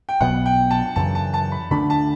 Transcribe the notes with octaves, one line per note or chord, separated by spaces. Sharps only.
G5
B1 B2 F#3 B3 F#5
G5
A5
F#2 C#3 E3 A5
A5
A5
B5
D2 D3 A3 D4 B5
A5